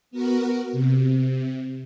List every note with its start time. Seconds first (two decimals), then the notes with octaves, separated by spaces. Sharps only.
0.11 B3 F#4 A#4
0.72 C3